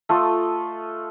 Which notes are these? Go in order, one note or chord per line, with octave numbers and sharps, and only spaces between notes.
A3 F4 A4 D#5